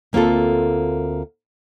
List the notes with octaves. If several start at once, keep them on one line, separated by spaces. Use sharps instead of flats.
D2 A#3 C4 F4 A4